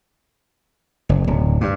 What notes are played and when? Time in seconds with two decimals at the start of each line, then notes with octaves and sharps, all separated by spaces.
1.09 F#1
1.27 D1
1.61 G2